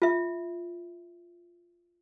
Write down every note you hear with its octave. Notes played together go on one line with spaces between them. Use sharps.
F4 E5